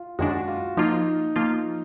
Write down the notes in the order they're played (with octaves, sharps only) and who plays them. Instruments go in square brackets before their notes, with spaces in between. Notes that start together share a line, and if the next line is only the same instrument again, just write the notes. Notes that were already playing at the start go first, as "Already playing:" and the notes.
Already playing: [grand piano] F4
[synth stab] F#2 D#3 G#3 D4 [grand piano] F#4
[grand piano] F4
[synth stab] F3 A#3 F4 [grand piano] D#4
[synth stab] F3 A#3 F4